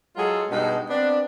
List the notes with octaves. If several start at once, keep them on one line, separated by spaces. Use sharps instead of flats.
F#3 G#3 F4 G#4 A4
G2 B2 G#3 D#4
B3 C4 D4